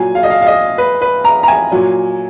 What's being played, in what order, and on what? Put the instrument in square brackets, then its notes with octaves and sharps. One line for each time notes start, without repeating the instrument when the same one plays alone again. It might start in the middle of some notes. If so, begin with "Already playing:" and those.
Already playing: [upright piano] A#2 F#3 G#5
F5
D#5
F5
F5
D#5
B4
B4
A#5
A#5
G#5
A#2 F#3